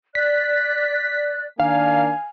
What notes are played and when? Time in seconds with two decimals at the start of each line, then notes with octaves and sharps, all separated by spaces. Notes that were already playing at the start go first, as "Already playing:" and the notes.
0.15 D5 F#6 B6
1.60 D#3 A#3 D4 F5 G#5